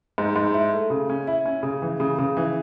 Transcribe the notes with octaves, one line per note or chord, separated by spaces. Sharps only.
G#2
G#2
E4
A3
C#3
C#4
E4
C#4
C#3
E3
C#3
C#3
E3